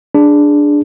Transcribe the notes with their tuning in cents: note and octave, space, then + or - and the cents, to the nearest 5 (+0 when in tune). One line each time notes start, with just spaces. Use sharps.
D4 +0 G#4 +0